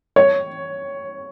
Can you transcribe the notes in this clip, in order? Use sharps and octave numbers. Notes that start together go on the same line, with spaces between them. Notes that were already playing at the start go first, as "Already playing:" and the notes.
C#5